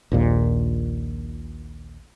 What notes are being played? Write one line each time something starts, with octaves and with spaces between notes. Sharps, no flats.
A#1 D#2 A#2